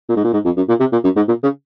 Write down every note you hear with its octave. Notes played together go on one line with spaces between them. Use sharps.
A#2
G#2
A#2
G#2
F2
F#2
A#2
C3
A#2
F#2
G#2
A#2
C#3